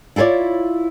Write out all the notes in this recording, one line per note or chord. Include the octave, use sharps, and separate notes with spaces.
E4 F4 G#4 C#5 D5